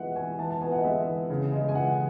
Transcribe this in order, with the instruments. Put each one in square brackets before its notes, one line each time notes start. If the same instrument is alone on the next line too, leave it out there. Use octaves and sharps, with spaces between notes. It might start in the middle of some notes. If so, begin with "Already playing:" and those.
Already playing: [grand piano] E3 G#3 B3 [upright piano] E5 F#5
[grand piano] E3 [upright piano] G#5
[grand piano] E3 [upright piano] A5
[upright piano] A5
[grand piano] B3 [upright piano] G#5
[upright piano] F#5
D#5
[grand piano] G#3 [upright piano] E5
[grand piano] E3
C#3
G#3
[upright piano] G#5
[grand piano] E3 [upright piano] F#5